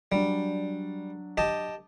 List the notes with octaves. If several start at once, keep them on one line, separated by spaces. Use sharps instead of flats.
F#3 G3 D4
G4 D#5 A5